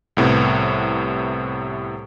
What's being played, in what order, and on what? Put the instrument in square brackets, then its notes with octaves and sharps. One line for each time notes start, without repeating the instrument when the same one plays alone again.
[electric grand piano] C2 A2 C3 B3